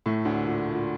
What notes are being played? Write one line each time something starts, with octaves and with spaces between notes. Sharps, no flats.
A2 A3
D2 D3
A#2
A#2